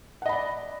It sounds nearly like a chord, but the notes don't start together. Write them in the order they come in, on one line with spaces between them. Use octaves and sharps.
F#5 D#5 B5 D5